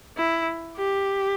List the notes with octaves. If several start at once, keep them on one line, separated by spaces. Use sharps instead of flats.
E4
G4